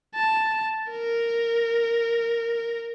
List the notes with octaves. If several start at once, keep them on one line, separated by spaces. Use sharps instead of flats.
A5
A#4